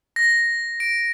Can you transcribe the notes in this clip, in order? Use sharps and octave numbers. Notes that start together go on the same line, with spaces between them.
A#6
D7